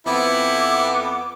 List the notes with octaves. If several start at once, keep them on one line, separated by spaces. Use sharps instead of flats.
F2 B3 E4 D6